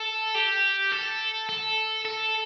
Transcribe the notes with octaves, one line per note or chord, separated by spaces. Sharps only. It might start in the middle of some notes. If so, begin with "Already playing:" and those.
Already playing: A4
G4
A4
A4
A4